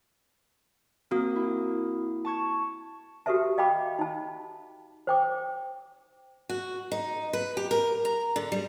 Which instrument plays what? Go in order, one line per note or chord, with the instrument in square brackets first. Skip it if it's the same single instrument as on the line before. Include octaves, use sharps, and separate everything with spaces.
[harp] A#3 [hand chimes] C4 F#4 D#6
[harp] E4
A5 C#6 G#6
[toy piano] F#4 G4 A4 B4 E5 A5
D#5 F5 G5 A5 B5 D6
D#4 A5
C5 G5 D6
[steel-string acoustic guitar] F#4
D#4
B4
G4
A#4
A#5
D3
G3